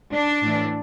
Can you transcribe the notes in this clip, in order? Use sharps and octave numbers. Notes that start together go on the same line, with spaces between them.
D4
A2 E3